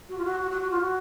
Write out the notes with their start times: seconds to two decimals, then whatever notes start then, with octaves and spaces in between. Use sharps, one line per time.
0.09 F#4
0.18 F4
0.24 F#4
0.40 F#4
0.51 F#4
0.61 F#4
0.70 F4
0.80 F#4